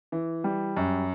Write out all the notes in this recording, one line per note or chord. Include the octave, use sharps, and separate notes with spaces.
E3
G3
F#2